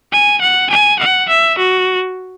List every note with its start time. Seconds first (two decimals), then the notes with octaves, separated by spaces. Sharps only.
0.12 G#5
0.41 F#5
0.70 G#5
0.99 F#5
1.28 E5
1.58 F#4